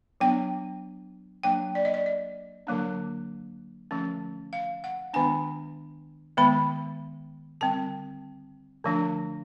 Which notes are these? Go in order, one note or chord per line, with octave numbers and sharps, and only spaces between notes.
F#3 B3 D4 G5
F#3 A#3 D4 G5
D5
D#5
D5
D#5
D3 F#3 A#3 D4
D3 F3 A3 C#4
F5
F#5
D#3 G#3 B3 D4 G#5
D#3 G#3 B3 B5
D3 G3 C4 A5
D3 F3 A3 D4